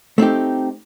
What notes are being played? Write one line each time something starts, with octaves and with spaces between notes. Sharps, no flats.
A3 C4 D#4 G4